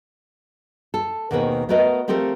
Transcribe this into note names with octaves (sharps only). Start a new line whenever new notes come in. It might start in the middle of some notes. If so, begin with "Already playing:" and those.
A4
D#2 B2 D#3 C4 G#4 B4
A3 B3 F#4 A#4 B4 D#5
F3 A3 C4 G4 A4 A#4